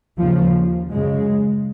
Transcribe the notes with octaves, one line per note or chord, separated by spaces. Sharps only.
D#2 C#3 F3
F#2 C#3 G#3